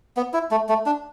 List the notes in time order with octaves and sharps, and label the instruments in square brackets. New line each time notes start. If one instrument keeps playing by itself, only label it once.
[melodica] B3
E4
A3
A3
D4